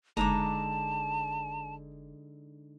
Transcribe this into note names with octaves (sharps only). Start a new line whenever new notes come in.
F#1 D3 G#3 D#4 A5 A#5 D6